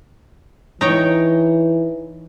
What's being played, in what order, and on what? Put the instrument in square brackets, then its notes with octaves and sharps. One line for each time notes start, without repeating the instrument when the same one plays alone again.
[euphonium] E3 [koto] D#4 C#5 G5